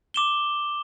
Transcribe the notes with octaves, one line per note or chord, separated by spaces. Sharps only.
D6 E7 G7